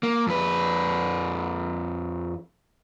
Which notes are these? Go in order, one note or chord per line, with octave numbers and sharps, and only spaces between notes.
A#3
F2 B4